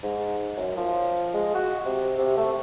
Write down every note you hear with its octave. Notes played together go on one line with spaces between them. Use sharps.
G#2
F#2
F3
G#3
F#4
C3
C3
A3